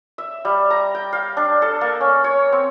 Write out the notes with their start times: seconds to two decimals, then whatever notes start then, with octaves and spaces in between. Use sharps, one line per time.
0.18 E5
0.45 G3
0.70 A#5
0.95 G5
1.13 F5
1.37 D4
1.62 A4
1.81 A#3
2.01 C#4
2.24 C#5
2.52 C4